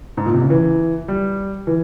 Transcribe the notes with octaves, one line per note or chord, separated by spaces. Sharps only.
G#2
A#2
C3
C#3
E3
G3
E3